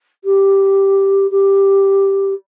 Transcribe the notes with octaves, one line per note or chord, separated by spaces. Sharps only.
G4
G4